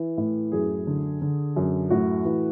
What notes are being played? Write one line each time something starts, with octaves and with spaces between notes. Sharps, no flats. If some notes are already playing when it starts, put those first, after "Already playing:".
Already playing: E3
A2
F#2 G#4
D3
D3
F#2
A2 F#4
E3